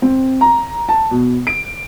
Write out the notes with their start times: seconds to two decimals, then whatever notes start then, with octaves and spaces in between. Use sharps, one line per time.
0.02 C4
0.41 A#5
0.89 A5
1.11 B2
1.47 D7